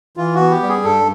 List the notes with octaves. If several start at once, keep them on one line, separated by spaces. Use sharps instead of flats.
E3 F4
F#4
B3
G4
G3
G#4
G2 A4